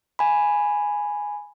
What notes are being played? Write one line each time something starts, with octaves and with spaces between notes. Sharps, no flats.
G#5 B5